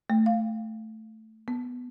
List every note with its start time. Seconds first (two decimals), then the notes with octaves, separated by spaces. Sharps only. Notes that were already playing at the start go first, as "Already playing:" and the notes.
0.10 A3
0.26 F5
1.48 B3